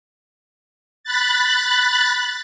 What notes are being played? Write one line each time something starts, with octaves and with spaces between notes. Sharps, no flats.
B5 F#6 A6